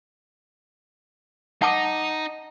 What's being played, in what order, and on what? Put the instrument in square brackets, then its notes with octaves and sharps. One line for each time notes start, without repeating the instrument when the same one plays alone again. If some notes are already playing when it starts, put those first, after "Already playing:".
[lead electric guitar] D#4 D#5 [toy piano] F#5 A5 D6